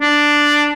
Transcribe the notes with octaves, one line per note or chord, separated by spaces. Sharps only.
D4